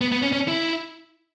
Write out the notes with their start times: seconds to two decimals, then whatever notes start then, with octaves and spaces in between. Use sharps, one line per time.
0.01 B3
0.12 B3
0.22 C#4
0.33 C#4
0.48 E4